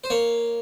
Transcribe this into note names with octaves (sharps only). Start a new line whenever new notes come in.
C5
A#3 C#5